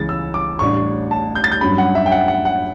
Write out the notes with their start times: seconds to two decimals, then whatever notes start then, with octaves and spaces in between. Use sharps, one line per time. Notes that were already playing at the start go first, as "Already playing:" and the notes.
Already playing: C#2 C#3 E3 A6
0.09 E6
0.34 D6
0.59 A1 A2 G3 D4 C#6
1.11 A5
1.35 G6
1.44 A6
1.52 G6
1.61 G2 F#3 C#4 B5
1.78 F#5
1.95 E5
2.06 G5
2.12 F#5
2.28 F#5
2.45 F#5